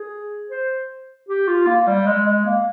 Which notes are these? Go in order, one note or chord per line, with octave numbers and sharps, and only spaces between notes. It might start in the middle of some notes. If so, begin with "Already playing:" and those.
Already playing: G#4
C5
G4
F4
A#3
G3
G#3
G#3
A#3